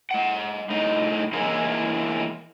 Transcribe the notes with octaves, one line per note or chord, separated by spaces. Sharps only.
G#3 F#5
A2 D#4
E3 G#3 A#3 D#4 E4